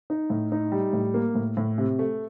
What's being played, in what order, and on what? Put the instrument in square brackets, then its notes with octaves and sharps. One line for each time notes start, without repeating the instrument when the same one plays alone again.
[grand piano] D#4
A2
D#4
G3
A2
A#3
A2
A2
C3
A3